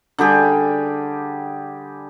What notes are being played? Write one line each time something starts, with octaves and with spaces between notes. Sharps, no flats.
D3 G3 G4 G#4